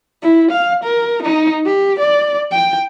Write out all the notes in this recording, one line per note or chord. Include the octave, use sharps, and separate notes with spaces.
E4
F5
A#4
D#4
G4
D5
G5